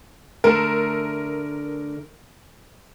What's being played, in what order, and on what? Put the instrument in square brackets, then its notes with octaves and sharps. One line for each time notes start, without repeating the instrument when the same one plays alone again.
[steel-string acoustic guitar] D3 A3 [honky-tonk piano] A#4